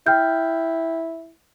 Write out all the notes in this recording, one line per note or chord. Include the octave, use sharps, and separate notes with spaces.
E4 G5 F6 G6